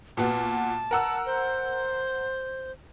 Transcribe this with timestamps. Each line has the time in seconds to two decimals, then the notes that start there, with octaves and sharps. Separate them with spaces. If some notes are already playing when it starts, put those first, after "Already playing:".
0.17 A#2 B3 F#4 A5
0.91 A#4 F#5 E6
1.26 C5